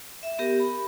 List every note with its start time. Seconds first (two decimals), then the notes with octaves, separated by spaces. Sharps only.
0.23 E5
0.39 B3 G4 A#4
0.60 B5